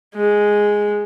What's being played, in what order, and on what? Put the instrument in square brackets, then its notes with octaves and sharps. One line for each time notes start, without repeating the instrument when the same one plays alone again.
[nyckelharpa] G#3